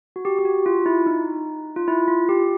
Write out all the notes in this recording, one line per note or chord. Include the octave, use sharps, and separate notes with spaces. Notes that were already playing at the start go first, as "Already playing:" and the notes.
F#4
G4
G4
F#4
F4
E4
D#4
F4
E4
F4
G4